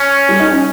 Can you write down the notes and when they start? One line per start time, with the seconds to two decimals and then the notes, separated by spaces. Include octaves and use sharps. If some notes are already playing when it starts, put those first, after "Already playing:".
Already playing: C#4
0.29 G3
0.40 D#4
0.52 C#4